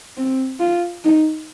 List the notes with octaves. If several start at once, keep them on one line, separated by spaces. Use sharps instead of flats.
C4
F4
D#4